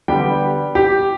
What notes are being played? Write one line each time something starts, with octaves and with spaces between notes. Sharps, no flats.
D3 G3 B3 G4 G5
G4